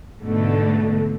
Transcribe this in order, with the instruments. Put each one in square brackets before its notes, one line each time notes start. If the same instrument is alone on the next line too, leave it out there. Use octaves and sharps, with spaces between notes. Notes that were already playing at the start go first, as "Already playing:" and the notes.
[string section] G#2 B2 D3 A3